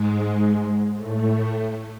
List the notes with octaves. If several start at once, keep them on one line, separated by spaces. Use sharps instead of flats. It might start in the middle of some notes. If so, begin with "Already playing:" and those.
Already playing: G#2 G#3
A2 A3